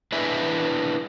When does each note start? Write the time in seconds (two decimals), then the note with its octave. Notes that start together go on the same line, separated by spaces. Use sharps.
0.12 D4 E4 G#4 B4 D#5 E5